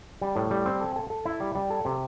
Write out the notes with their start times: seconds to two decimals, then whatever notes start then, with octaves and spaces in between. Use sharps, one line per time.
0.21 G3
0.36 A2
0.51 G3
0.66 C4
0.81 A4
0.96 A4
1.10 A4
1.25 E4
1.40 G3
1.55 G3
1.70 A4
1.85 C3